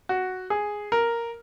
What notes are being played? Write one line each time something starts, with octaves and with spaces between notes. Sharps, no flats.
F#4
G#4
A#4